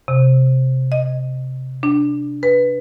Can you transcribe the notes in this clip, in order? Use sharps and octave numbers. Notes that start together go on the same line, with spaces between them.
C3
D#5
D4
B4